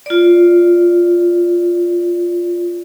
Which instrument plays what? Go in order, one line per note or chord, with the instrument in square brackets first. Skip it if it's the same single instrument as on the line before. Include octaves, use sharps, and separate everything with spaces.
[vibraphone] F4 D5